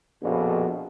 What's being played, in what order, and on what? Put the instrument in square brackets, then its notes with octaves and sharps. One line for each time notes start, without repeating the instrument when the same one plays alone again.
[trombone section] A#1 F2 B2